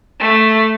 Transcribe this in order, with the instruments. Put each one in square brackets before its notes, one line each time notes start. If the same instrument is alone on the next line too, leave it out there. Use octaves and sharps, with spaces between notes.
[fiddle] A3